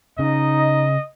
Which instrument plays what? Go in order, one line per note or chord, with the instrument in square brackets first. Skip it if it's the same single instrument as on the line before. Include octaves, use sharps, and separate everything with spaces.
[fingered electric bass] C#3 C#4 [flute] D#4 [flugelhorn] D#5